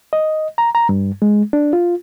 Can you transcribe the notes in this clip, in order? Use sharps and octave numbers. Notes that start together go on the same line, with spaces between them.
D#5
A#5
A#5
G2
G#3
D4
F4